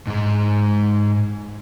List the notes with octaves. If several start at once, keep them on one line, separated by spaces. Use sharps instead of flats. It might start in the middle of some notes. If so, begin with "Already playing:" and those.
G#2 G#3